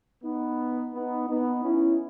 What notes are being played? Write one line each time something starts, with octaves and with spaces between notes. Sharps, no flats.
B3 D#4
B3 D#4
B3 D#4
C#4 E4